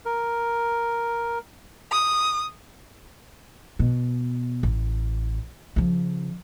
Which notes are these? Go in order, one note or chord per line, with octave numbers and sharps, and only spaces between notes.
A#4
D#6
B2
A1
C#3 F3